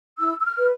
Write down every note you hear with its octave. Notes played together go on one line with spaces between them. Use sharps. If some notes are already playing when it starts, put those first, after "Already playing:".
E4 E6
E6
F6
B4